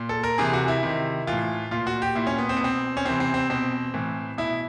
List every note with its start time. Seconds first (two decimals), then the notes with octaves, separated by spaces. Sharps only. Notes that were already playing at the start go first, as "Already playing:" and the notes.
Already playing: A#2
0.09 A4
0.24 A#4
0.38 C3 E3 G#4
0.53 F#4
0.68 E4
0.83 C3 D#3
1.27 A2 E3 F4
1.71 A#2 F4
1.87 F#4
2.02 G4
2.15 A#2 E4
2.27 C#4
2.38 B3
2.49 C4
2.57 B3
2.60 B2 C4
2.97 C#4
3.05 C3 E3 C4
3.20 C4
3.34 C4
3.50 B2 C4
3.94 A2 E3
4.38 B2 E4